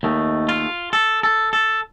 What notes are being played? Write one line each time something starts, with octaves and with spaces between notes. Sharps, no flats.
D#2 D#3 A3
F4
A4
A4
A4